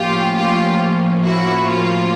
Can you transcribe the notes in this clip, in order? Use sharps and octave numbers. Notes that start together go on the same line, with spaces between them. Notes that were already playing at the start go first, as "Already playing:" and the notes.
Already playing: A2 F3 A#3 C#4 F4 G4
F4 G4
E4 F#4
F4